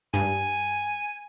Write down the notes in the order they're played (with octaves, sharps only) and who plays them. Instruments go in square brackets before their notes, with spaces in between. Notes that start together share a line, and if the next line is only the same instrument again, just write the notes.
[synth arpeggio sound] G2 [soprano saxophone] G#5